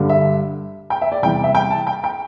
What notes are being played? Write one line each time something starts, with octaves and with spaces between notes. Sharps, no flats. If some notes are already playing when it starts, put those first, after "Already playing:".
Already playing: G2 D3 G3
E5
G5
E5
D5
E2 C3 E3 G3 G5
E5
G5
A5
G5
G5